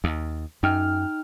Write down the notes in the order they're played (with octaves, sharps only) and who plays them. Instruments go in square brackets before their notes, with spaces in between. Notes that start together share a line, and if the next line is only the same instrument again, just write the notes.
[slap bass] D#2
[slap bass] F#2 [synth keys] D#4 G5 F6